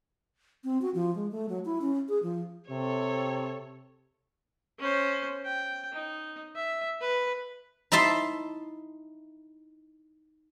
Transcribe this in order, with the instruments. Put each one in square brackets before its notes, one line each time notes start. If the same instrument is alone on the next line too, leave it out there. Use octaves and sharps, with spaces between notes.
[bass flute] C4
F#4
F3
G#3
A3
F#3
E4
C#4
G#4
F3
[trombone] C3 [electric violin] A4 C#5
[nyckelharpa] C#4 C5
G5
D#4
E5
B4
[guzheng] D#4 E4 E5 A5 C6